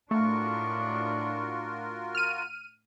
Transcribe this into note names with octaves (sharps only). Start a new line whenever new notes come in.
A2 A3 D4 F4 F#4 A#4 C#6
F6 D#7